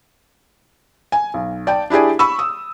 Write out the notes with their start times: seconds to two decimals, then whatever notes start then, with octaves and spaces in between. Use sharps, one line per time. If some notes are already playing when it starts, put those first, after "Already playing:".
1.12 G#5
1.34 B1
1.67 D5 G5 A5
1.90 D4 E4 G4 G#4 D5
2.19 B5 C#6 E6
2.39 D#6